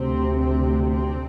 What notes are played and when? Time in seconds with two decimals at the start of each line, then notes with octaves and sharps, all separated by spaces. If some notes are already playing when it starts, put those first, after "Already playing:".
Already playing: D2 C3 C4
0.36 C4
0.87 C4